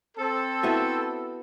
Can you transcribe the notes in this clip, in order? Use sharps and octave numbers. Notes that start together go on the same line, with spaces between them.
C4 A4
B3 E4 F#4